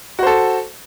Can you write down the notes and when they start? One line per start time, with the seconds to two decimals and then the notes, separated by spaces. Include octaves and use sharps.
0.19 F#4
0.23 C5
0.27 A4